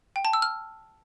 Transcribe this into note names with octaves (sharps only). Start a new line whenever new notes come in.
G5
A5
E6
F6